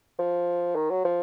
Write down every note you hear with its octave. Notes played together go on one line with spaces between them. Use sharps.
F3
D#3
F#3
F3